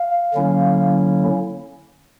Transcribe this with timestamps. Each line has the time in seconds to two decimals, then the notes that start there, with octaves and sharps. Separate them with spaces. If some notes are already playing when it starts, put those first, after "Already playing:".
Already playing: F5
0.34 D3 F#3 A#3 C#4 E4